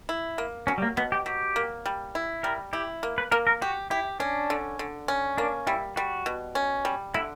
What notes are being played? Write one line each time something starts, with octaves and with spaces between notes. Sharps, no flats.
E4
A#3
F#3 C#4
G3
A#3
B2 B3
G4
F#3 G4
A#3
G3
E4
G3 A#4
E4 G4
A#3
B4
A#3 A#4
A#4
F#4 G4
E4 G4
C#4 D4
D3
D3
C#4
A#3 D4
G3 E4
G3 F#4
B2
C#4
G3
D3 E4